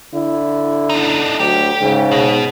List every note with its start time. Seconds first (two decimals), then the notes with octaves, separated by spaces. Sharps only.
0.15 D3 E4
0.90 D4 D#4
1.39 D2 F#3 G4
1.82 G#2 C#3
2.11 B2